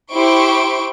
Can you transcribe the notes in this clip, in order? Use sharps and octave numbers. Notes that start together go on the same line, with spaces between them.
E4 G4 C5 C6 C#6 D7